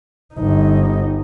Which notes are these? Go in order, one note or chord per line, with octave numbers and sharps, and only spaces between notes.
G1 D#4